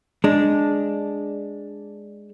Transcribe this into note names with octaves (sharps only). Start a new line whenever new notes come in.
G#3 D4